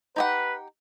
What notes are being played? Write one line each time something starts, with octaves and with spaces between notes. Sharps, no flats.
D#4 G4 B4 F#5